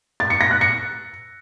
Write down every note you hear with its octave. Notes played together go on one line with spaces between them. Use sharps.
A6
C#7
A#6
F#6
C#7